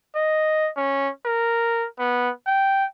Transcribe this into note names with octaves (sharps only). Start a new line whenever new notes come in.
D#5
C#4
A#4
B3
G5